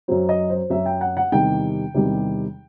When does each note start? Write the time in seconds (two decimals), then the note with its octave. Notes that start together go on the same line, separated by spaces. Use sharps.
0.08 F#2 F#3 C5
0.29 D#5
0.50 C5
0.70 F#2 F#3 E5
0.86 G5
1.01 F#5
1.17 F#5
1.32 E2 C3 D#3 G3 G5
1.94 E2 C3 D#3 G3